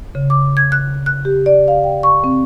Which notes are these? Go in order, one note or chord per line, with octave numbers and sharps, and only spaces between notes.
C#3
D6
G#6
F#6
F#6
G4
D5
F5
G5
C#6
C4